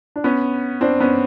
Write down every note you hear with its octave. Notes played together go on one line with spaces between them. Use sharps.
D4
B3 C#4
C4 D4
B3 C#4